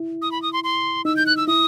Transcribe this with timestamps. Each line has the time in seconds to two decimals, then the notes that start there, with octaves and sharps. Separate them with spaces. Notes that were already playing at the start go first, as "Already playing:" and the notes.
Already playing: E4
0.22 D#6
0.32 B5
0.42 D#6
0.53 C6
0.64 C6
1.05 D#4 E6
1.17 G6
1.26 F#6
1.37 E6
1.48 E4 D#6